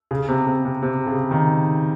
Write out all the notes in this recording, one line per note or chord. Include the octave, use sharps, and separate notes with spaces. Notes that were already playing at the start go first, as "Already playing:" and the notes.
C#3
C3
C3
C3
C3
C#3
D#3